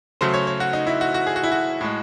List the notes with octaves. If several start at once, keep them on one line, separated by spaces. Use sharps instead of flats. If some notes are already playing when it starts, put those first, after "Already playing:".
C#3 F#3 A3 C5
C#5
C#5
F#4
D#4
E4
F#4
F#4
G#4
F#4
E4
F#4
A2 G#3